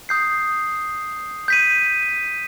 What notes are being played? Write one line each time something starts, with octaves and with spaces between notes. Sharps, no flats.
D#6 G6 C7
G6 B6 D#7